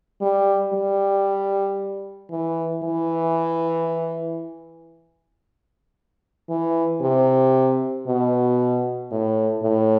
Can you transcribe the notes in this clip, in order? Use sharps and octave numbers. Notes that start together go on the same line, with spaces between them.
G3
G3
E3
E3
E3
C3
B2
A2
A2